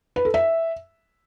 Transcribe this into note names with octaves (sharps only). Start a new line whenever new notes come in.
B4
A4
E5